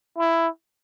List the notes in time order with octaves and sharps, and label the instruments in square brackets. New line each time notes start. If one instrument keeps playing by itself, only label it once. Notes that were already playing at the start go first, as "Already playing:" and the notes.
[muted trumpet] E4